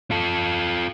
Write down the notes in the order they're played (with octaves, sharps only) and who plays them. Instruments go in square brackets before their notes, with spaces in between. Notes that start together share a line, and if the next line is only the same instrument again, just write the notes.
[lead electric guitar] F4 A4